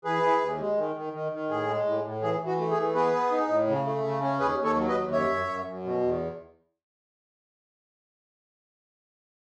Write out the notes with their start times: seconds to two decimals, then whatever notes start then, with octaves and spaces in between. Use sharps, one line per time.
0.04 E3 G#4 B4
0.23 E3
0.41 D#2
0.59 G#3
0.77 D#3
0.96 D#3
1.13 D#3
1.32 D#3
1.49 A2 G#4
1.67 G#3
1.86 A2
2.04 A2
2.22 E3 G#4
2.40 E3
2.46 F#4
2.58 A3
2.71 G#4
2.77 E3
2.94 B3 G#4 B4
3.13 B3
3.32 D#4
3.48 A2
3.68 C#3
3.85 A3
4.04 C#3
4.22 C#4
4.40 D#2 G#4 B4
4.58 D#2
4.64 A4 C#5
4.76 F#3
4.88 B4 D#5
4.95 D#2
5.12 F#2 C#5 E5
5.30 F#2
5.48 F#2
5.66 F#2
5.84 B2
6.03 E2